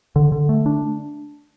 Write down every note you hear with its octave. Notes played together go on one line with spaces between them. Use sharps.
D3
D3
A3
D4